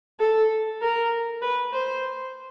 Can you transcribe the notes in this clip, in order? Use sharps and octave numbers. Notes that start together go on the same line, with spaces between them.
A4
A#4
B4
C5